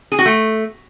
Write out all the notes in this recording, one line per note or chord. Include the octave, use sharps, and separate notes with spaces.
G#4
F#4
A3